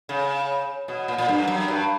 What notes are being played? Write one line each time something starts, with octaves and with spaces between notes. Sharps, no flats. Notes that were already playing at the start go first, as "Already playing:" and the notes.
C#3
B2
A#2
A#2
G2
F#2
G2